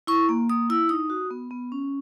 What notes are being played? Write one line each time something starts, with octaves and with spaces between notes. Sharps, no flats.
E4 C#6
A#3
A#3 D#6
E4 E6
D#4 D#6
F#4
B3
B3
C#4